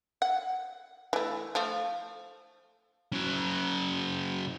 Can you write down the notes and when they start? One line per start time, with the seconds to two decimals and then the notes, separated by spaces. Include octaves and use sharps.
0.22 F#5
1.13 E3 A3
1.55 F3 A3
3.12 C#3 F#3